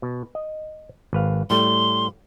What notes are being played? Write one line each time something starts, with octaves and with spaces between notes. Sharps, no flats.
B2
D#5
G#1 B4 F5
A2 G3 A3 C6